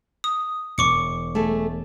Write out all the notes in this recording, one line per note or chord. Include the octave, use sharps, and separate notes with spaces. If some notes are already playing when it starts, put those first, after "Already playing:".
D#6
E1 C#6 D6 C#7
A3 G#4 A4